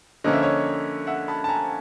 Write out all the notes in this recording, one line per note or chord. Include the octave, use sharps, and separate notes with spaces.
D3 F3 A#3 C#4 D#5
E5
C#5 D#5
E5 F#5
A5 B5
A5
G#5 A#5